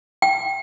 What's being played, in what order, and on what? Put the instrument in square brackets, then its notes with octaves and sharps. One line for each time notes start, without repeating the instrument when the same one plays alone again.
[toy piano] G5